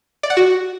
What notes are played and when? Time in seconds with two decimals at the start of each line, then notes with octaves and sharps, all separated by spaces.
0.23 D5
0.30 F#5
0.37 F#4